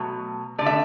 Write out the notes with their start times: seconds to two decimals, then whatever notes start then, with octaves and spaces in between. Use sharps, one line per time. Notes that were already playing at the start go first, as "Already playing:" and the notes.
Already playing: B2 F#3 A3
0.58 D3 A3 D5
0.66 E5